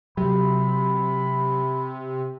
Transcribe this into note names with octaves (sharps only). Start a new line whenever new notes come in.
C3 F#3 B5